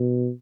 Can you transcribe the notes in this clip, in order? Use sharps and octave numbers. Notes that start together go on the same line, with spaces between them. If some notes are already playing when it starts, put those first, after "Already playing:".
Already playing: B2